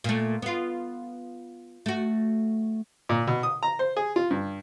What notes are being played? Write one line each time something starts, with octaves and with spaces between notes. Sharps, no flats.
A#2 A3
B3 F4
A3 F#4
A#2
B2
D#6
A#5
C5
G#4
F4
G2